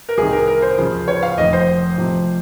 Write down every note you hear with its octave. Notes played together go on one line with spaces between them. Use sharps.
A#4
C2 C3 D#3 G#4
A#4
A#4
C5
D#2 C#3 F3
C#5
F5
F1 F2 D#3 D#5
C5
F1 F2 C3 F3